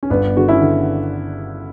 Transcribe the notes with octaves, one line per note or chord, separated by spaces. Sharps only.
C#4
G1 B3 D4
D3 F#4
C#4 E4
D3